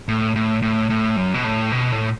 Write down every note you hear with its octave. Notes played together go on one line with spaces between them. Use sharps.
A2
A2
A2
A2
F#2
B2
A2
B2
A2